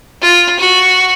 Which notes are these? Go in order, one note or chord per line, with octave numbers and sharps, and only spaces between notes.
F4
F#4